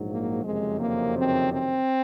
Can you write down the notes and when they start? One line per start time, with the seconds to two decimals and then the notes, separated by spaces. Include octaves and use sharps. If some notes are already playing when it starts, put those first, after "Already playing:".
Already playing: A#1 G#2 F#3
0.09 A#3
0.44 F#1 F2 C3 D#3 F#3 G#3
0.80 A#3
1.16 C4
1.51 C4